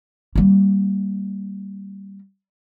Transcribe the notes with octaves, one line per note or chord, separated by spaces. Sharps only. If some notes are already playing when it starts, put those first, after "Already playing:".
G3 A#3